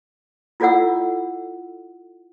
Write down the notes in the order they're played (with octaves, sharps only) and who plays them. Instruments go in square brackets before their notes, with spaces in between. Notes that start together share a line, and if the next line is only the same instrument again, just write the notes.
[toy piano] E4 F4 A4 D5 F#5 E6